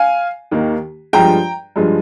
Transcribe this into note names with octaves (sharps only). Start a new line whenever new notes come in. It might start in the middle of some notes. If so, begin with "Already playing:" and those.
Already playing: F5 G#5
D#2 D#3 A#3
G2 F3 G#3 G5 A#5
G2 F3 G#3